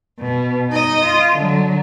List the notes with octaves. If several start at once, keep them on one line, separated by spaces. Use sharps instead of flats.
B2
D#4 D#5
F4
D3 F#3